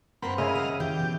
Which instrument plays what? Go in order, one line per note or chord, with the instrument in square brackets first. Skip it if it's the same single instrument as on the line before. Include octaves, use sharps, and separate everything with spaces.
[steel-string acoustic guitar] G2 A#4 F#5 [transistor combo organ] A#3 C4 B5
[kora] C#3 E4 [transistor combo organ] D#5 F5
[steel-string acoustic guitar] F#5
[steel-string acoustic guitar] E3 [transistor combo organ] G4
[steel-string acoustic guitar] B2